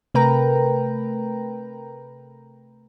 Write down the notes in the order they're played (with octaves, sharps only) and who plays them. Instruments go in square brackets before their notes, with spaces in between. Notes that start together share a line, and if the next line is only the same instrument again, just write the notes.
[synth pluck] C3 A3 A#4 B4 G5 A#5